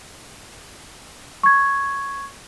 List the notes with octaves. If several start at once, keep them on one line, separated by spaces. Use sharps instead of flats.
C#6 G#6